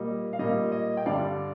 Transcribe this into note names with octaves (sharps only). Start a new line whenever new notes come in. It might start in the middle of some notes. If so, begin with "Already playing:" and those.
Already playing: A#2 G3 A#3 D#5
F5
A#2 G3 A#3 D#5
D#5
G5
G2 D3 G3 D4 D5 F5